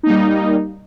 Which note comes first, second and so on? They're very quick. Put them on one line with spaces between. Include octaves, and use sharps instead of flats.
D#4 A#3 G3